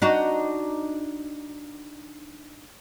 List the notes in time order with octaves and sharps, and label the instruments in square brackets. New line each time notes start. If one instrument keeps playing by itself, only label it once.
[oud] D4 D#4 F#4